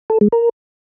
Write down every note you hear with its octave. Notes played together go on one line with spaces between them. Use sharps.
A4
G#3
A#4